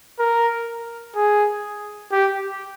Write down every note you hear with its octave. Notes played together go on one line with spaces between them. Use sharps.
A#4
G#4
G4